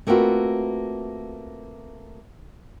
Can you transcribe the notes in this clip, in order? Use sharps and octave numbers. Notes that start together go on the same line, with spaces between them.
A3 A#3 C4 F4 F#4 B4